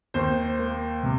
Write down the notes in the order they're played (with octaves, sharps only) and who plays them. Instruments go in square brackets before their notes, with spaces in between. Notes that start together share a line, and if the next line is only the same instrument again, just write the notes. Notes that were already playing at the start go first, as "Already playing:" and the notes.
[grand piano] D#2 C5
A#3
C3